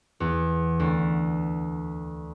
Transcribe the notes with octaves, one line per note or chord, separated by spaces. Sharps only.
E2
D2